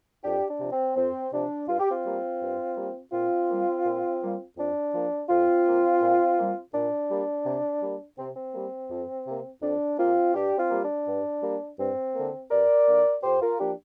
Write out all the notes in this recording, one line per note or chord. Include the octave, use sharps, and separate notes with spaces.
F2 D4 G4
D4
C3 F3
C4
F2 C4
C3 F3 D4
G2 F4
G4
C4 F4
G3 A#3
G2
G3 A#3
A#2 C4 F4
G3 A#3
A#2
G3 A#3
F2 D4
F3 A#3
F2 C4 F4
F3 A#3
A#2
G3 A#3
A#2 D4
G3 A#3
C3
G3 A#3
C3 C4
C4
G3 A#3
F2
C3 A#3
F2 D4
C3 A#3 C4 F4
G2 D4 G4
C4 F4
G3 A#3
D4
G2
G3 A#3
G2 C4
D3 A#3
G2 A#4 D5
D3 A#3
F2 G4 C5
F4 A#4
F3 A#3 D4 G4